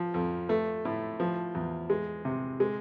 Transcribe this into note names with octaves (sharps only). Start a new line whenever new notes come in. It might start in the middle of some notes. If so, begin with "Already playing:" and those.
Already playing: F3
F2
A3
A2
F3
E2
G#3
C3
G#3